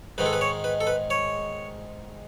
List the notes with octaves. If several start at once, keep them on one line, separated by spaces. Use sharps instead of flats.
G#2 D#3 G#3 B4
A4
B4
C#5
B4
A4
B4
C#5